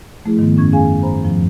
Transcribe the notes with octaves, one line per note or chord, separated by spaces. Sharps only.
F3 A3 E4 G#4
G#2 D#3 B3
F#2 C#4 C#6 G#6
C#4 G#4 F5 G#5
C5 A#5 B5
F2 G#2 F3